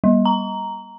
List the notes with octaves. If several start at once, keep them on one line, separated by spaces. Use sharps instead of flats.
G3
A#5